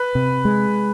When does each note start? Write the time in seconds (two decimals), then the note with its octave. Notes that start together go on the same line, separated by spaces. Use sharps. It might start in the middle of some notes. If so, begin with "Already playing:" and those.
Already playing: B4
0.15 C3
0.45 G#3